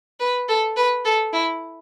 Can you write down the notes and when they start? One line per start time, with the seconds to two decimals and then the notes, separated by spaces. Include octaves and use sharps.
0.20 B4
0.49 A4
0.77 B4
1.05 A4
1.33 E4